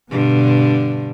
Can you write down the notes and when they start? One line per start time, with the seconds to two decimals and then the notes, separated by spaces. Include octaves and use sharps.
0.11 G2 B2 D3